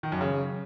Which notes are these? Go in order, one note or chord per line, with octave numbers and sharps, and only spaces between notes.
D#3
F#2
C#3